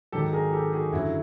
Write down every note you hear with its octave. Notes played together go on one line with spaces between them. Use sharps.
G#2 D#3 F#3 G4 A4
G#4 A#4
G4 A4
F#4 G#4
F#2 D3 F#3 E4 F#4